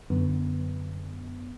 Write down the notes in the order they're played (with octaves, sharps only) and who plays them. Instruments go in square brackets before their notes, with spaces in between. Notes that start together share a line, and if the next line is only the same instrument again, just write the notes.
[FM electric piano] F#2 D3 B3